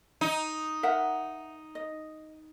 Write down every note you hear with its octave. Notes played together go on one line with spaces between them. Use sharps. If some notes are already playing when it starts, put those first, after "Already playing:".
D#4
A#4 E5 F#5
D#5